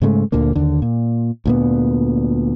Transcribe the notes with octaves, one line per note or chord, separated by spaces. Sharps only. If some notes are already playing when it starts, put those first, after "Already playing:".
G#2 C#3 G#3 A3
D2 A#2 D3 A#3
D#2 D3
A#2
D2 A#2 B3